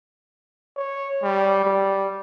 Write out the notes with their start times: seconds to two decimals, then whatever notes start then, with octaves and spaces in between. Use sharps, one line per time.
0.76 C#5
1.23 G3
1.65 G3